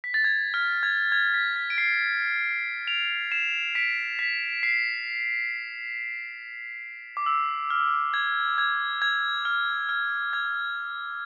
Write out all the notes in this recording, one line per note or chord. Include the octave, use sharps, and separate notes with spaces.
B6
A6
G#6
F6
G#6
G#6
B6
B6
D7
C7
D7 F7
C7 E7
B6 D7
B6
C7
D6
E6
F6
G#6
G#6
G#6
F6
F6
G#6